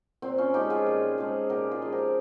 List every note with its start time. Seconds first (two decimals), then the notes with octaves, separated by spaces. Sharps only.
0.22 A#2 C4
0.38 C#4 F4
0.54 F3 G#3 D#4 G4
0.70 F4 G#4
0.86 A#2
1.18 F3 G#3
1.49 A#2 G4 A#4
1.71 F4 G#4
1.82 F3 G#3
1.92 G4 A#4